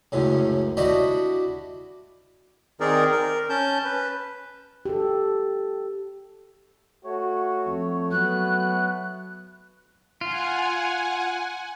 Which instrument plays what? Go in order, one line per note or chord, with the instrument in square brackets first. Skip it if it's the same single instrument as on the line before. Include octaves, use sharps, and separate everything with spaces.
[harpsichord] C#2 F#2 A2 C#3
D4 E4 F#4 G4 D5 D#5
[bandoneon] D#3 C4 D#4 G#4 A#4 D5
A#4
C#4 A5 G6
B4
[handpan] G4 A4
[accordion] A3 C#5 [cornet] F#4
[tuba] F2
[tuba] F#3 [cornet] B3 [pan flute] F#6
[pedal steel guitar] F4 [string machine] F#5 G#5